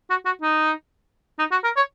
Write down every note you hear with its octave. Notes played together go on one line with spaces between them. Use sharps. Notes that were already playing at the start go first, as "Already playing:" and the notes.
F#4
F#4
D#4
D#4
F#4
A#4
C#5